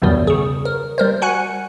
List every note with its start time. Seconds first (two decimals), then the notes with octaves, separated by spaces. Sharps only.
0.02 B1 E2 G2 B2 D#3 G3
0.27 C#3 G#4
0.65 A#4
0.98 G3 A#4 C5
1.22 F#4 F#5 G#5 F#6